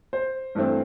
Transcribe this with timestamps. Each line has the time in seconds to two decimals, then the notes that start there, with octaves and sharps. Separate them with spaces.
0.13 C5
0.55 G2 E3 A3 C4